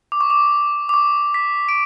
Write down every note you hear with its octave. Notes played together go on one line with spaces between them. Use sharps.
D6
C#6
D6
D6
C#6
B6
D7